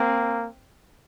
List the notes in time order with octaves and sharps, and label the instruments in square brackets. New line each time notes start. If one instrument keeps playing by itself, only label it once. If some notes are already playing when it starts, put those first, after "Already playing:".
Already playing: [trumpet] A#3 [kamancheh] C4